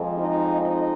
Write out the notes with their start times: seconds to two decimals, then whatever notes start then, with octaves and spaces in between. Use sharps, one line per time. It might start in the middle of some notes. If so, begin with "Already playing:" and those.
Already playing: F2 F3 G#3
0.17 D#4
0.61 D#4